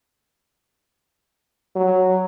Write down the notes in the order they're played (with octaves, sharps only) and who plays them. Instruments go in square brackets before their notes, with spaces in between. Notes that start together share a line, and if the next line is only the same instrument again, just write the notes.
[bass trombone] F#3